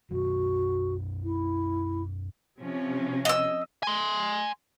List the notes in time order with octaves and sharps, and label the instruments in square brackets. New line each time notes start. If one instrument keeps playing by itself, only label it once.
[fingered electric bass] F#2 B2 F#3 [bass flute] F#4
[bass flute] E4
[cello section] C3 F3 C#4
[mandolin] D#5 E6
[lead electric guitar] G#5 C6